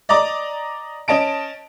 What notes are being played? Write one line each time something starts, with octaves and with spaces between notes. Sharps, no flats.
D5 D#5 A#5 D6
C#4 D#5 A5 D7